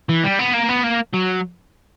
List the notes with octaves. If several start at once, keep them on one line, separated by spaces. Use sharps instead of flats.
E3
G3
B3
A#3
B3
A#3
F#3